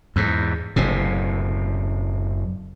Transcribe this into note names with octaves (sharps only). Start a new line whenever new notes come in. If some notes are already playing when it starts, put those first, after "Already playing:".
E2 G#2
F#1 A2 C3